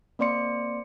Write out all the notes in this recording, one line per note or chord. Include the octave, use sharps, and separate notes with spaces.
A#3 C4 D5 C6 C#7